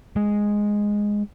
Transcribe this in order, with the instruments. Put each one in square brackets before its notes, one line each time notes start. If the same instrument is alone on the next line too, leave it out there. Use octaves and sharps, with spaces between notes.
[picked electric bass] G#3